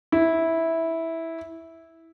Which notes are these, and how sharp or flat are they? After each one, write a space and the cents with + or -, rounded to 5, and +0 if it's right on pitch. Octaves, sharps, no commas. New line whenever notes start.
E4 -10